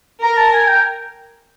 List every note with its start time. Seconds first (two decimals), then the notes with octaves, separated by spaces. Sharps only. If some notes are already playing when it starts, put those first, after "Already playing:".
0.23 A#4 A#5
0.37 A5
0.52 G#5
0.67 G5